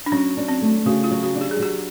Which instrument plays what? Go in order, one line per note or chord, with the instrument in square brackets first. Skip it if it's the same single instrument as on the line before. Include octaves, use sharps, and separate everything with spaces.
[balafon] D4
[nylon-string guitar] F#3 [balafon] C#4
[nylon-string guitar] D4
[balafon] C4
[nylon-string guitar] A3
[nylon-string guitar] C#3 [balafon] F#4
[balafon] F4
[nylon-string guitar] F#3
[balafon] F#4
[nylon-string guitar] D4
[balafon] G4
G#4
[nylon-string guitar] F#3 [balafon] G4